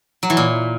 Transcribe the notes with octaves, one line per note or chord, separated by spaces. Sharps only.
F#3
E3
A#2